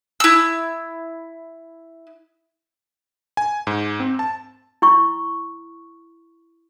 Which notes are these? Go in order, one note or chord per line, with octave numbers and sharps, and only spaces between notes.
E4 E6
G#5
G#2
C4
A5
E4 C#6